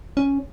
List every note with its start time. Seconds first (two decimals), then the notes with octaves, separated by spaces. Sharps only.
0.17 C#4